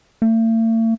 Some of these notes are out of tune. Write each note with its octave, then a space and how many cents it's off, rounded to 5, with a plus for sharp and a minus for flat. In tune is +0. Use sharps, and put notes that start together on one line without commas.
A3 +45